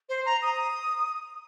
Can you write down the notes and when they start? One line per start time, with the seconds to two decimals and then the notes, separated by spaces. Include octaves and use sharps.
0.09 C5
0.25 A#5
0.42 D#6